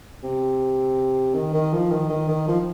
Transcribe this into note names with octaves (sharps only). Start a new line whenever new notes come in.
C3
D#3
D#3
F3
D#3
D#3
D#3
F3